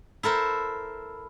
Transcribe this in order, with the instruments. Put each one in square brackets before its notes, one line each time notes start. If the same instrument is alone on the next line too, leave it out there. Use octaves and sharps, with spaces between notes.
[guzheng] E4 A4 A#4 C5